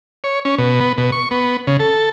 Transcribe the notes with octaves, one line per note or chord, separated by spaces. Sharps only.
C#5
C#4
B2
B3
B2
C#6
B3
C#3
A4